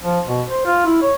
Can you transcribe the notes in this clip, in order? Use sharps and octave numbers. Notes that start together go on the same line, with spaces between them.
F3
B2
C5
F4
E4
C#5